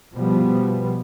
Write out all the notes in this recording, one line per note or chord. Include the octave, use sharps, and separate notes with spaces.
B2 F3 G3 B3